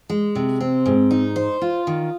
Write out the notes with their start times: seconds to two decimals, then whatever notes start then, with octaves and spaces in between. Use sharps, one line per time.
0.10 G#3
0.35 C3
0.61 C4
0.86 G#2
1.11 D#4
1.36 C5
1.62 F4
1.87 D#3